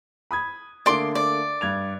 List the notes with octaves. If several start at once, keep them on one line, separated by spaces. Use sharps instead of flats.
B5 D#6 G#6
D3 A3 A#3 D5 C6 D6
D5
G2 G#6 F7